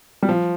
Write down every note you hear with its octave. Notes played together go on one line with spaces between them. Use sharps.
G3
F3